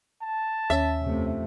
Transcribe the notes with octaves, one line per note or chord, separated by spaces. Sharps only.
A5
D#2 C#4 E5
F2 C3 A3